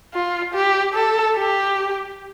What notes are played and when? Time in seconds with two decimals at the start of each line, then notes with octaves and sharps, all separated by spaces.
0.14 F4
0.54 G4
0.94 A4
1.36 G4